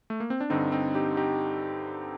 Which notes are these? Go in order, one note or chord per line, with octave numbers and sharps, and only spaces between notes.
A3
A#3
C4
D4
G2 D3 C4 D#4
C4 D#4
D#4 G4
D#4 G4